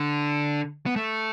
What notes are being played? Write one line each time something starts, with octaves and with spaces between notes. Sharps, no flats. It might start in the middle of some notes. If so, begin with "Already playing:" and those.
Already playing: D3
B3
A3